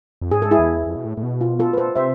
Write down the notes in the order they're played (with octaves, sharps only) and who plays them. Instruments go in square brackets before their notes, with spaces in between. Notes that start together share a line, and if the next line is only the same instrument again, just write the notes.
[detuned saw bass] F2
[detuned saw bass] G#2 [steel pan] G#4
[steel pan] A4
E4 G#4
[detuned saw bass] E2
F2
B2
A2
A2
B2
[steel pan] F4
F4 A4
B4
A4 C5
[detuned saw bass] C3 [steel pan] C5 E5